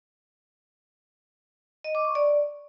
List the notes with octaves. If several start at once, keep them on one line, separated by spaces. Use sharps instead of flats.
D#5
D6
C#6
D5